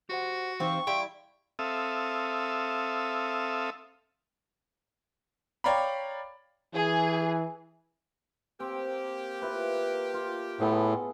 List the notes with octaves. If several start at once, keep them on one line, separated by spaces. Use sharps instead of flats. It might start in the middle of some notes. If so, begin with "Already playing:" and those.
F#4 G4 C5 F#5
E3 C4 D#4 F4 G4 C#6
G3 E4 F5 G5 C6
C4 A4 E5 F5 D#6
C#5 D5 F5 G5 A#5 B5
E3 G#4
A#3 C4 G4
E4 F4 B4
F4
A2 B3 G#4 A4